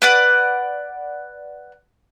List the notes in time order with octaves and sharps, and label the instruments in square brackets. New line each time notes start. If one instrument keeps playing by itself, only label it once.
[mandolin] B4 D5 F#5